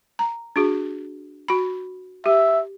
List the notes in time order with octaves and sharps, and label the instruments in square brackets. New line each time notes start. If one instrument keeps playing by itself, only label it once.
[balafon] A#5
D4 F#4 G#4
F#4 B5
[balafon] G4 [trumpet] E5